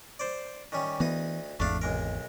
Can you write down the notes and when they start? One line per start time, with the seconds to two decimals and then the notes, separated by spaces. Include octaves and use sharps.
0.19 C5 D5
0.72 D#3 G3 C#4
1.00 D2 E3 B3 D#4 D#6
1.60 G#1 E2 A3 D4 F5
1.81 B1 G#3 A#4